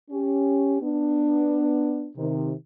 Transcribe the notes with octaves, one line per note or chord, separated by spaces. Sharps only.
C#4 G4
B3 D4
C3 D#3